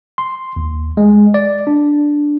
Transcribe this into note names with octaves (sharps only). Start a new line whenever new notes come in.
C6
D#2
G#3
D5
D4